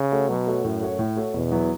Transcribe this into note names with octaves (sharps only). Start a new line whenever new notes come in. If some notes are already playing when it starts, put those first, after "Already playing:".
Already playing: C#3
A3 F#4 C#5
B2 F#3
A3 F#4 C#5
F#2 A2
A3 F#4 C#5
A2
A3 F#4 C#5
E2 B2
F#3 B3 E4